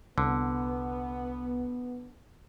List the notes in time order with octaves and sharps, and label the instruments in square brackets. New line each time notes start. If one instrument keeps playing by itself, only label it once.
[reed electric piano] C2 [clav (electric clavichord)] D3 [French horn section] B3